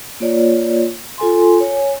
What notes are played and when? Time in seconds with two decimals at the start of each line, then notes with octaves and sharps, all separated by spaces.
0.20 A#3 F4 C#5 D5
1.18 F4 A4 G#5 C6
1.61 C#5 G#5